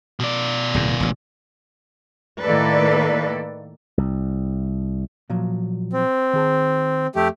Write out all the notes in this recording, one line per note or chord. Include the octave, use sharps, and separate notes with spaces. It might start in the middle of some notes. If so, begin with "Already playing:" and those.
B2 D5
D1 E2
E1 A1
A2 D#3 A#3 A4 B4 D5
C2
A#2 F3 F#3
C4
D#3 G#4 A5
F2 A3 G4